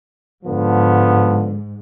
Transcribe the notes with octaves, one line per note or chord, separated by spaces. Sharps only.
G#2 D3 F3 B3